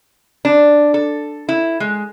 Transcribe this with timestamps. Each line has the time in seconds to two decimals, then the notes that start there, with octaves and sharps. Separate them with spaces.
0.45 D4
0.94 A4
1.49 E4
1.80 G#3